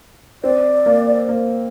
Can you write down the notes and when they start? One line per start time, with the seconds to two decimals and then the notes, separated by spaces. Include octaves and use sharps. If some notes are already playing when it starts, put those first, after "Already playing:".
0.43 C4 D5
0.86 A#3
1.29 A#3